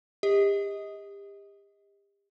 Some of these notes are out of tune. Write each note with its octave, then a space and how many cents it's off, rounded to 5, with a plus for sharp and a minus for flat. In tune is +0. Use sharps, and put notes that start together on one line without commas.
G4 +35 D#5 +25